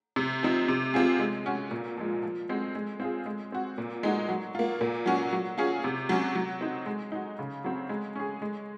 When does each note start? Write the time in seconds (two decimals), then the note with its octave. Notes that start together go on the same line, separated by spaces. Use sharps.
0.16 C3
0.43 F3 C4 D#4
0.68 C3
0.94 F3 C4 F4 G#4
1.20 G#3
1.46 C#4 F#4
1.71 A#2
1.97 F3 G#3
2.23 F3
2.49 G#3 C4 F#4
2.75 G#3
3.00 C4 F4 G#4
3.26 G#3
3.52 C4 F#4
3.78 A#2
4.03 G#3 D#4 F#4
4.28 F#3
4.55 A#3 F4
4.81 A#2
5.06 F#3 C#4 F#4
5.33 F#3
5.58 C#4 F4 G#4
5.84 C3
6.09 F#3 C#4
6.35 F#3
6.61 C4 D#4
6.86 G#3
7.12 D#4 F#4
7.39 C#3
7.64 F#3 C4
7.89 G#3
8.15 C#4 G#4
8.42 G#3